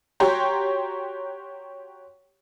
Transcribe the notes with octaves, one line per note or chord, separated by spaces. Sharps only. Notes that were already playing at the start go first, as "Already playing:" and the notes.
F#4 G4 C#5 G5 A#5 C6